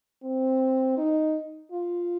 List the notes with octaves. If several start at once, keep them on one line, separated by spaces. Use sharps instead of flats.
C4
D#4
F4